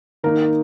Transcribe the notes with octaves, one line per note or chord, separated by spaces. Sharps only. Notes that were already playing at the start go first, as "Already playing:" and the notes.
D#3 A#3 D#4 A#4